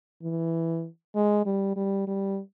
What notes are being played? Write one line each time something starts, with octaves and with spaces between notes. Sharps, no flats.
E3
G#3
G3
G3
G3